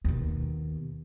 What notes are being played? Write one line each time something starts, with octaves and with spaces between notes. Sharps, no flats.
D#2 B2